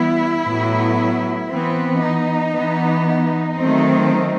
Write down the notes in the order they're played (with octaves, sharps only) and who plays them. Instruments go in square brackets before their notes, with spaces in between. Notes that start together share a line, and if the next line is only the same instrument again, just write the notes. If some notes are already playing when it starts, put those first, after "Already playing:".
Already playing: [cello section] E3 G3 B3 E4
A2 F#3 B3
E3 B3 C4
D#4
E3 B3
D#4
D#3 F#3 A3 C4